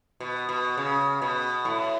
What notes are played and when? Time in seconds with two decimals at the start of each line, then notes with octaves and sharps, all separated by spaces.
0.20 B2
0.49 B2
0.77 C#3
1.22 B2
1.65 A2